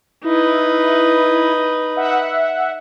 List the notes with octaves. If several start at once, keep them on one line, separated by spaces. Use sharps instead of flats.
D#4 E4 B4
E5 F#5